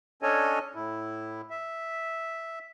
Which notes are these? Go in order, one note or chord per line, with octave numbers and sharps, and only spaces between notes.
C#4 D4 A4 C#5 D#5 G#5
A2 E4
E5